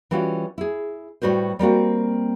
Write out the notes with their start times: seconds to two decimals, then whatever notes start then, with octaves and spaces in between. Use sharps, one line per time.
0.11 E3 G3 C#4 F4 F#4
0.58 E4 G#4
1.22 A2 G3 F#4 B4 C5
1.59 G3 A#3 C4 F#4